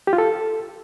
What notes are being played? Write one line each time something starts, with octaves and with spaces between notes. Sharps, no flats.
G4
F4
A4